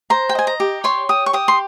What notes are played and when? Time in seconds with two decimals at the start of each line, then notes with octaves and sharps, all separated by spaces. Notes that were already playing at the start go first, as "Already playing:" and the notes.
0.10 C5 A#5
0.29 G5
0.35 D#5 G#5
0.47 A#5
0.60 G4
0.84 C#5 C6
1.09 G4 D#6
1.26 C#6
1.33 G4 D#6
1.48 C6